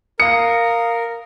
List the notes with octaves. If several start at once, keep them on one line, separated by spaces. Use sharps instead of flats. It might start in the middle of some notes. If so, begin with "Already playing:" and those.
A#4 F5 D#6 C#7